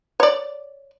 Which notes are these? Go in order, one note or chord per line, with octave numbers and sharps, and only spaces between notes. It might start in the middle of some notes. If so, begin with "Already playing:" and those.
C#5 D5